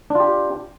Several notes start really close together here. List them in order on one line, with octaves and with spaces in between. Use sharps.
D4 F4 G4